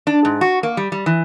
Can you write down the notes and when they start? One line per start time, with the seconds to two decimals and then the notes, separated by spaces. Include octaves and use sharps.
0.07 D4
0.25 G#2
0.41 F#4
0.63 A#3
0.77 G3
0.92 G3
1.06 E3